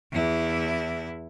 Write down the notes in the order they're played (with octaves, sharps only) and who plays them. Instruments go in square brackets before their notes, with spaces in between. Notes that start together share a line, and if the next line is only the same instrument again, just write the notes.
[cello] E2 E4